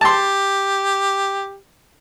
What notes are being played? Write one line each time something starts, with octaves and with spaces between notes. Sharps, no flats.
G4 A5 C6